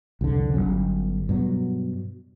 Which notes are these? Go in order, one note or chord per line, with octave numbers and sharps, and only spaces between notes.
C2 F2 D3
G1 F#2 F#3 C#4
G2 B2 F#3